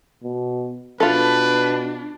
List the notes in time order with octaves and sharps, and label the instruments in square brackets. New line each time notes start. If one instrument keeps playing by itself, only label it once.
[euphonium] B2
[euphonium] B2 [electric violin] D4 [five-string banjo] F4 A4 [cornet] B4